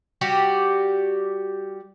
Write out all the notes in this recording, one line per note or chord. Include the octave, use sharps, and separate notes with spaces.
G3 F#4 G4